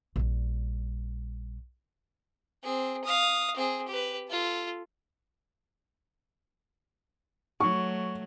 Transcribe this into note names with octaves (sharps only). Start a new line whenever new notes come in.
A#1 G3
C4 G#4
F5 D#6
C4 G#4
G4 B4
F4 A4
F#3 A3 C#6